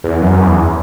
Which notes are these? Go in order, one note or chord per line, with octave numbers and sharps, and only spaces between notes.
E2
F#2
E2